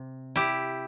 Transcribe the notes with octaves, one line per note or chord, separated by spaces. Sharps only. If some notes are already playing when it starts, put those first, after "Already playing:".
Already playing: C3
E4 G4